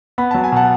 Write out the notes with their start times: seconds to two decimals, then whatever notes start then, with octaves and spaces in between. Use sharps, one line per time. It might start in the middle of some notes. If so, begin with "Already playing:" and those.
0.18 B3 B5
0.31 F#3 A5
0.44 G#5
0.52 B2 F#5 A5